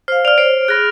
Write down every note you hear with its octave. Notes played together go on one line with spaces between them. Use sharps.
C5 F5 F6
D5 F6 F7
C5 C#5 D7
G#4 B5 F#6 A#6